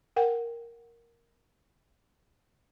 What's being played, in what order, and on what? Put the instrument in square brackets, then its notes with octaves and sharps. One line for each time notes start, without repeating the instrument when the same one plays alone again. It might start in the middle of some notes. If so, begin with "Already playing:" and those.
[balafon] A#4 F#5 G5